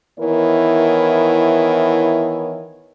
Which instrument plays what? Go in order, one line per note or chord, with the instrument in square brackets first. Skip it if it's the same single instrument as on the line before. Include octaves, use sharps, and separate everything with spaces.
[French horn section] D#3 E3 B3 E4 A#4 C#5